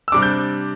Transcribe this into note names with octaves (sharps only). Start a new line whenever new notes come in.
E6
C3 G3 D4 D6
G6